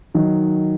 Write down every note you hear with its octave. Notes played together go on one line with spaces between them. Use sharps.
D#3 F#3 D#4